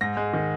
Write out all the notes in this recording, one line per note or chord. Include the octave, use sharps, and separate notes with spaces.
G#2 A#6
G#3
D#3